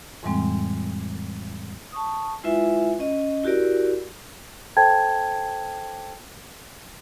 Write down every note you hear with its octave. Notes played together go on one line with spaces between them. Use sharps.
F2 A2 E3 G3 G#3 C4
A5 C#6 D#6
G#3 E4 F4 B4 E5 G#5
C#4 D#5
E4 F#4 G4 A#4 D5
A4 C5 G5 A5 G#6